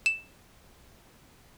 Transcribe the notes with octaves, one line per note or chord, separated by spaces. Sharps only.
E7